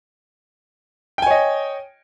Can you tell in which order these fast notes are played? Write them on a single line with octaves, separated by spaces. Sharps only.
G5 G#5 C#5 D#5